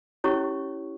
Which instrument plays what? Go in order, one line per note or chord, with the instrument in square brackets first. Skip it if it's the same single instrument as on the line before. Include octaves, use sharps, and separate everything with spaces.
[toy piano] C#4 E4 G4 C#5 C#6